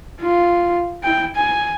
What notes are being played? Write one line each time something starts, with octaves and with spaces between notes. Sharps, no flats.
F4
E4 G5
G#5